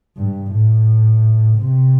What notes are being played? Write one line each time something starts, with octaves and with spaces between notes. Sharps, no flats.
G2
A2
C3